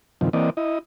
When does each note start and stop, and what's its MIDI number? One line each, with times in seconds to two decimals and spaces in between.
0.21 0.29 43
0.21 0.29 48
0.21 0.29 51
0.21 0.29 53
0.33 0.50 52
0.33 0.50 58
0.33 0.50 60
0.33 0.50 74
0.33 0.50 75
0.57 0.79 64
0.57 0.79 75